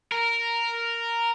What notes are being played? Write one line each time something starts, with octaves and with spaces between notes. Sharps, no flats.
A#4